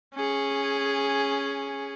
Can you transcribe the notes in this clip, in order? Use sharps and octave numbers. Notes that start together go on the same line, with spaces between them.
C#4 G#4